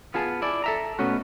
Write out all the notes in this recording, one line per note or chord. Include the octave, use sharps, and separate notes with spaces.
B3 F4 G#4 A5
E4 D5
A4 E5 A#5
B2 A3 B3 C#4 F#4